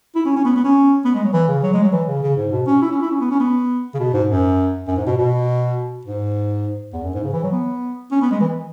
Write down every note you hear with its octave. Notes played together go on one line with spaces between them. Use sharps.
E4
C#4
C#4
B3
B3
C#4
B3
G#3
F#3
E3
C#3
F#3
G#3
F#3
E3
C#3
C#3
G#2
B2
C#4
E4
C#4
E4
C#4
B3
C#4
B3
C#3
B2
G#2
F#2
F#2
G#2
B2
B2
G#2
E2
F#2
G#2
C#3
E3
F#3
B3
C#4
B3
G#3
E3